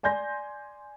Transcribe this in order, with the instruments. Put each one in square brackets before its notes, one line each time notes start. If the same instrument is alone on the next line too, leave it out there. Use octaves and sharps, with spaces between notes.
[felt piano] D5 G#5 C6 G6 A#6